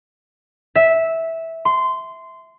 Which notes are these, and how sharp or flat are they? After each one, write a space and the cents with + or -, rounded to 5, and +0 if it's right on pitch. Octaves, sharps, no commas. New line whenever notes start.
E5 -10
C6 -15